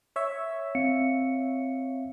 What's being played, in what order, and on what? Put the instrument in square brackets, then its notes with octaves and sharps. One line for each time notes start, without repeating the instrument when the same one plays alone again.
[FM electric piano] C#5 E5
[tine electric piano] C4 F5 C#7